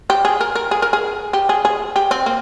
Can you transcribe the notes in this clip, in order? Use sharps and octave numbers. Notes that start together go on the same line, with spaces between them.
G4
G#4
A#4
A#4
G#4
A#4
G#4
G4
G#4
G#4
G4
C4
A#3